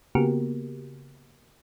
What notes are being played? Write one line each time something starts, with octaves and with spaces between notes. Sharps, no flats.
C#3 A#3 B3 F#4 G4 A#4